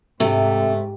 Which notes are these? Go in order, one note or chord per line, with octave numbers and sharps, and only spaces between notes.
G#2 C3 A3